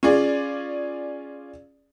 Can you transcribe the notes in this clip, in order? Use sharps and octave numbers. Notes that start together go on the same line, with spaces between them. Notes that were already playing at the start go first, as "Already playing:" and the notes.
C#4 F4 G#4 D5